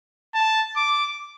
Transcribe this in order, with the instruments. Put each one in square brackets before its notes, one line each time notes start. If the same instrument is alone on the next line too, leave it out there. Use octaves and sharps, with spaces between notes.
[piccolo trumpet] A5
D6